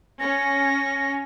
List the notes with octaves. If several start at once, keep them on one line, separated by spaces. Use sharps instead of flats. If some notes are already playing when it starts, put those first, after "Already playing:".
C#4 A#6